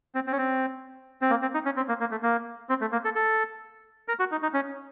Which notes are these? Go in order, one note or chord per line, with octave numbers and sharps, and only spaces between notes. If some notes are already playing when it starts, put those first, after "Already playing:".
C4
C4
C#4
C4
C4
A#3
C4
D#4
C#4
C4
A#3
A#3
A3
A#3
C4
A3
A#3
A4
A4
A#4
F#4
D#4
D#4
C#4